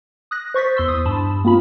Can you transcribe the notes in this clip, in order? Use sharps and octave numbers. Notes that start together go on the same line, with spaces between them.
D#6 F#6 A#6
C5 C#6 A6 B6
E2 C6 E6
D#6
G2 A5 B5
A#3 C4 F4 B5